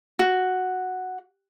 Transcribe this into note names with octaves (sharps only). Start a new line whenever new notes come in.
F#4